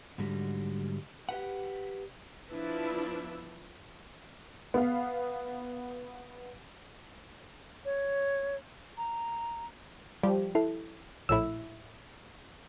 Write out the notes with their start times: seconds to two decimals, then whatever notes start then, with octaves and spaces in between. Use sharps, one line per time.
0.18 G#2 D3 F#3 G3
1.29 G4 B4 F#5
2.49 F3 B3 D4 E4 B4 E5
4.74 B3 F5
7.85 C#5
8.97 A#5
10.23 F3 G3 G4
10.55 E4 A4
11.29 A#1 A2 E4 E6